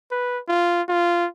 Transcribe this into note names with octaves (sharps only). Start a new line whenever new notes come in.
B4
F4
F4